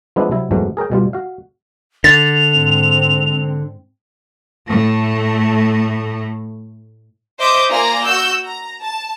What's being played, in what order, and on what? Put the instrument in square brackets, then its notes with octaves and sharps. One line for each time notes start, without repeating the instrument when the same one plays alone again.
[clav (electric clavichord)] F3 G#3 B3 D4 E4
C3 F#3 E4
E2 G#2 E3 F#3 A3
G#4 A#4 C#5 G5
B2 G3 F4
F#4 F5
[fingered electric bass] D3 [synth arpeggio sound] A6 [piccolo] F7
[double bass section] G#2 C4
[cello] A2 A3
[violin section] C5 D#5 E5 D6 G6
A#3 F4 D5 G#5 A#5
F#4 E6 G6
A#5
A5